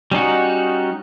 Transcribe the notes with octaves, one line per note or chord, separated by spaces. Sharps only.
G3 C#4 D#4 F#4